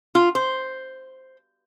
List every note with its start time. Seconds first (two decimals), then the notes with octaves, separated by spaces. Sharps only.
0.15 F4
0.35 C5